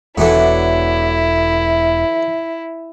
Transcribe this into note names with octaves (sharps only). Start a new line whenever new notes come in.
E1 D3 E3 F#3 E4